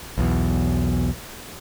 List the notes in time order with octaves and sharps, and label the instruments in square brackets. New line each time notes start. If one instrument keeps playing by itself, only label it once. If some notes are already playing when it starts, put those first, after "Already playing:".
[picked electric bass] B1 E2 B2